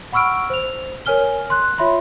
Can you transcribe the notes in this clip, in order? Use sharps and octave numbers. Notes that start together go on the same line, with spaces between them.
F#5 B5 C#6 E6 F6 D7
C5 F7
A#4 C#5 G#5 F6 G7
C6 F#6
F4 C#5 E5 B5 C6